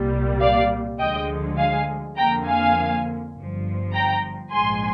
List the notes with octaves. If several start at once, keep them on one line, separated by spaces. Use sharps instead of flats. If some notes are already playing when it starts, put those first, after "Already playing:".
Already playing: C2 A#2 G3 A#3
D5 F5
D2 D3 F3 G#3 D#5 G5
F5 G#5
F2 D3 F3 A#3 G5 A#5
F5 G#5
G1 G2 F3
G5 A#5
A#1 G#2 F3 G#3 G#5 C6